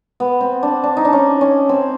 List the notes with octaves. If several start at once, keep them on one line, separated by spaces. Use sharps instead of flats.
B3
C4
D4
D4
D#4
D4
C#4
C#4
C4